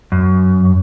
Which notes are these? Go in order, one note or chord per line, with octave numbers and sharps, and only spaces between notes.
F#2